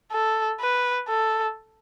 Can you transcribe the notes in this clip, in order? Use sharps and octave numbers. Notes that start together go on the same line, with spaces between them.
A4
B4
A4